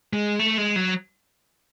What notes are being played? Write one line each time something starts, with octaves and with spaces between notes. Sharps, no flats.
G#3
A3
G#3
F#3